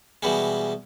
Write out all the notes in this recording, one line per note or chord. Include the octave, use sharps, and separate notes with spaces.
B2 E3 G3 G#3